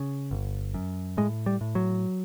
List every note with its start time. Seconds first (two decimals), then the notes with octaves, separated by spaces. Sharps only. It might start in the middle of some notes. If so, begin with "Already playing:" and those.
Already playing: C#3
0.31 G1
0.74 F#2
1.17 A2 G#3
1.46 G3
1.61 A2
1.75 F#3